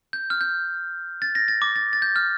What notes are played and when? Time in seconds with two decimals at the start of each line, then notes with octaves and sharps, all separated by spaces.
0.13 G6
0.30 F6
0.41 G6
1.22 A6
1.35 A#6
1.48 A6
1.62 D6
1.76 A6
1.93 A6
2.02 G6
2.16 F6